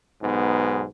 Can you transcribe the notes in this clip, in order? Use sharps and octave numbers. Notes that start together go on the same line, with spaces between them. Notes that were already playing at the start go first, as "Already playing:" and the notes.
B1 G#2 B3